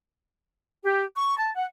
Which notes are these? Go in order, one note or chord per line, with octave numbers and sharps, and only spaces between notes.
G4
C#6
A5
F#5